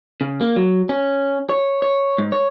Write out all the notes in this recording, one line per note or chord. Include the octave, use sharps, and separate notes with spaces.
C#3
A#3
F#3
C#4
C#5
C#5
G#2
C#5